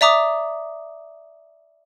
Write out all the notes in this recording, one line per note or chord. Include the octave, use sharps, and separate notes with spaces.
D5 E5 A#5 D6 D#6